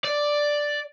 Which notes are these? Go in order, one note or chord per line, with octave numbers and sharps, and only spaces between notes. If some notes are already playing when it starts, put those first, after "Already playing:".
D5